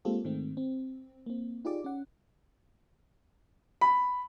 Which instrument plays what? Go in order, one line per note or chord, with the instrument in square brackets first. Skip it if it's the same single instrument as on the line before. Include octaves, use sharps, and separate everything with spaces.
[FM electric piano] G#3 A#3 C4 F4 G4 A4
G#2 D#3 G#3 A3 C4
C4
A#3 C4
D#4 F4 G4 G#4 D5 D6
C#4 F#5
[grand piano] B5